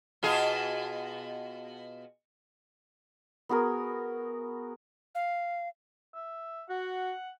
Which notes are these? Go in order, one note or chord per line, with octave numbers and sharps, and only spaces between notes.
B2 F4 G#4
B3 F#4 G#4 A#4
F5
E5
F#4 F#5